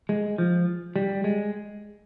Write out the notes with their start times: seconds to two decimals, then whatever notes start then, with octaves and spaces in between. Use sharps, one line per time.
0.09 G#3
0.38 F3
0.96 G3
1.24 G#3